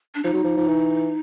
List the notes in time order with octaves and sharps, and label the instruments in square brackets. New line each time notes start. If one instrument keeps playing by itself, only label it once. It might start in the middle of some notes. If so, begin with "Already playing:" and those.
[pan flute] D4
[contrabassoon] F3 [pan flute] D#4
[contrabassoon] F#3
F3
F3
E3